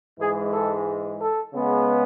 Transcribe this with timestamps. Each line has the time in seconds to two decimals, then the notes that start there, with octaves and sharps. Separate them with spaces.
0.20 G#2 E3 G#3 G#4
0.53 A4
1.20 A4
1.53 C#3 G#3 B3